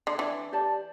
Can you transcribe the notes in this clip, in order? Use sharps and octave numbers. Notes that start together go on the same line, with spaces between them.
D3
E3 D4
G4 D5 A5